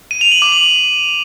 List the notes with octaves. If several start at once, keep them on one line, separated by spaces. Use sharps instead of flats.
D#7
F7
F#7
D6
F#7